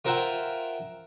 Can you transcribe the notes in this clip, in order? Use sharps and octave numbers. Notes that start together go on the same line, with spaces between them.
F4 A#4 C5 E5 F#5 G5